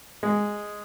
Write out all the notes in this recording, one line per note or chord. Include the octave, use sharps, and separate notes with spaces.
G#3